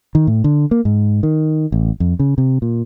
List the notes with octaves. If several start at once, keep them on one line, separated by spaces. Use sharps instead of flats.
D#3
A2
D3
A#3
G#2
D#3
A1
F2
C#3
C3
A#2